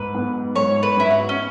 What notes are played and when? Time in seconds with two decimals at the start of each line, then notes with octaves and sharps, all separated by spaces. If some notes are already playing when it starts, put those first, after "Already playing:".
Already playing: G#2 B4
0.15 B3
0.56 G#2 C#5
0.83 B4
0.97 G#2 E4
1.11 F#4
1.29 C#4